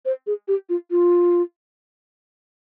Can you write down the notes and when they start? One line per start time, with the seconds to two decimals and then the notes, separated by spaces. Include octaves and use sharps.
0.05 C5
0.27 G#4
0.48 G4
0.69 F4
0.91 F4